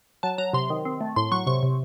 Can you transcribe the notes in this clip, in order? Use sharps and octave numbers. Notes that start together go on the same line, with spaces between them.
F#3 A5
F#3 A#5
C3 C6
D#3
C4
A3
A2 C6
F#3 C#6
C3 C#6
C3